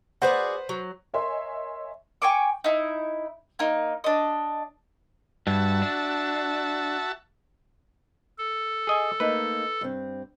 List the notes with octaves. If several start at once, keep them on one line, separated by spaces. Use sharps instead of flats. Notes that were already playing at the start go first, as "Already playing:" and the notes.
F#4 G#4 B4 C5 D5 F#5
F#3
A#4 C#5 D#5 E5 G#5 C6
G5 G#5 C#6 D6
D#4 E4
A#3 D#4
D4 D#5
G2 F#4 E5 A5
D4
A4
G#4 D#5 G#5
A3 A#3 D#4 B4
G2 C4